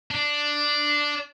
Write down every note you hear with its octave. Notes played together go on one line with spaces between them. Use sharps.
D4